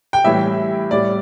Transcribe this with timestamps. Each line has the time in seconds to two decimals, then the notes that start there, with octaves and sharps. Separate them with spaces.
0.13 G5
0.25 A2 E3 G3 E5
0.91 A2 G3 D5